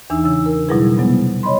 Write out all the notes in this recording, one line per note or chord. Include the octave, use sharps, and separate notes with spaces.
E2 E3 D4 D#4 E6
C#3 E6
A#4
B2 F#3 G3 E4 G#4 B4
C3 F#3 G#3 B3
C#5 D#5 B5 C6